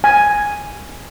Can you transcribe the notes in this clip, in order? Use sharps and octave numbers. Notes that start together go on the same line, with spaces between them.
G#5